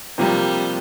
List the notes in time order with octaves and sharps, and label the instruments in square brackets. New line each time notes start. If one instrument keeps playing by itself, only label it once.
[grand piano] C3 F3 A#3 [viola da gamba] G3